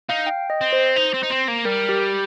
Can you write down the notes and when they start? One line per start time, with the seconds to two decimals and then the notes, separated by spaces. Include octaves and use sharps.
0.09 D#4 F5
0.27 G5
0.50 D#5
0.61 C4
0.72 C5
0.96 D#4
1.14 C4
1.23 D#4
1.31 C4
1.48 A#3
1.65 G3 A#4
1.89 G4